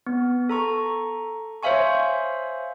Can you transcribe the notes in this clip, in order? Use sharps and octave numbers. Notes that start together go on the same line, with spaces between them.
B3
A4 A#5 C#6
C5 C#5 E5 F5 G#5 C#6